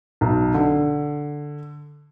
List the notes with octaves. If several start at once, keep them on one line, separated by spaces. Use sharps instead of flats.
B1
D3